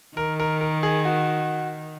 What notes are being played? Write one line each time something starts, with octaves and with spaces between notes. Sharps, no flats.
D#3 A#4
A#4
A#4
G#4
F#4